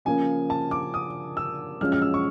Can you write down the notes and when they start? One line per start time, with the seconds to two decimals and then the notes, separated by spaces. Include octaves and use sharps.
0.05 C#3 F3 A#3 C#4 G#5
0.50 A5
0.71 D6
0.94 D#6
1.37 E6
1.81 F#2 C#3 F3 G#3 C#4 F6
1.92 F6
2.02 E6
2.14 C#6